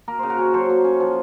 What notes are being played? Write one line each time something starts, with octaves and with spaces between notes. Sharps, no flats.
A#3 A#4
C#3 C5
F#4 A#4
C#4
F#3 A4 C5
A#3
C#4
F3